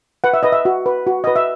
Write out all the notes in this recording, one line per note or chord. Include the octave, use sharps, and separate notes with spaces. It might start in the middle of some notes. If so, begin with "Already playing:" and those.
B4 F#5
E5
B4 D#5
E5
F#4
B4
F#4
B4 D#5
E5